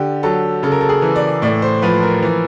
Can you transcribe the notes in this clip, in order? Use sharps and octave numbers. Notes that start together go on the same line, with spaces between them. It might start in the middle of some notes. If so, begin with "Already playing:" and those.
Already playing: D3 G4
F#3 A4
C#3 A4
A#4
A4
G#4
E3
D5
A2 D5
C5
F3 B4
A#4
E3